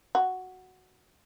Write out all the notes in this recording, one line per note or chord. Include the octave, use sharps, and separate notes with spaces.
F#4